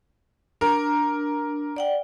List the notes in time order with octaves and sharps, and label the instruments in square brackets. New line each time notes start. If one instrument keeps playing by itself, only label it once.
[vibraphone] D4 [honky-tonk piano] A#4
[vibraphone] D5 F#5 G5